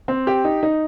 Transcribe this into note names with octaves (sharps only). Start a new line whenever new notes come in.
C4
G4
D#4
D#4